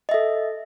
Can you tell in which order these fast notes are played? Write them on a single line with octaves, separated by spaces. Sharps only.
D#5 E5 A4